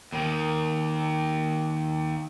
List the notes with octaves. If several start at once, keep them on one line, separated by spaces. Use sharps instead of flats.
D#2 D#3